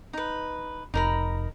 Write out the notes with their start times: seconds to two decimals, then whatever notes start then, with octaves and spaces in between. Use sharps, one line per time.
0.13 D#4 B4
0.94 F1 D#4 A#4 B5